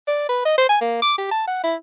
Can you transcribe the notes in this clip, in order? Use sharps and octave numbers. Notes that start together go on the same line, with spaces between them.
D5
B4
D#5
C5
G#5
A#3
D6
G4
A5
F#5
E4